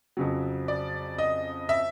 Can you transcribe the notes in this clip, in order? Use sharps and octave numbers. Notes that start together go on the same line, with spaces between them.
F2 C#3 F#3
D5
D#5
E5